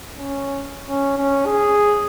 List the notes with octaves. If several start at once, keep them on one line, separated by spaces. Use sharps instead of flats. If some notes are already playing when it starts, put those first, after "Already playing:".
C#4
C#4
C#4
G#4